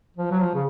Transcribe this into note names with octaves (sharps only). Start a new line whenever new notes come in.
F3
F#3
F3
C#3